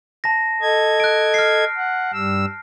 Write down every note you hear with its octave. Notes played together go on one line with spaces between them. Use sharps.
A5 A#6
A4 D#5 G#6
F#6 D7
F6 C7
F#5
G2 G3 E6